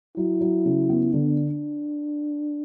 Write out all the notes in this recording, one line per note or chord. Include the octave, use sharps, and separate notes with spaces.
F#3 E4
F#3
C#3
B3
D3 D4